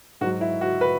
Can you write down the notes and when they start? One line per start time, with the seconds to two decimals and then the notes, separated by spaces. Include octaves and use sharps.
0.21 G#2 F#3 F#4
0.41 E4
0.61 F#4
0.81 B4